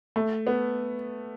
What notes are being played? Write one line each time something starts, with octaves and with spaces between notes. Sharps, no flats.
A3
B3